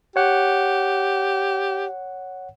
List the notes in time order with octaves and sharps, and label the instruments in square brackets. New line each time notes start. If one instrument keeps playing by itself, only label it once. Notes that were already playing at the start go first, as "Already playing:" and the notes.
[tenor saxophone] G4 [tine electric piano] C#5 F#5